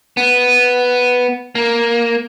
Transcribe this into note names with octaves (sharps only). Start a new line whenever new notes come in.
B3
A#3